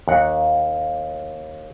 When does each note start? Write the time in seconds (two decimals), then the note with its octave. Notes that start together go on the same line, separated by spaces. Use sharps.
0.08 D#2 F#5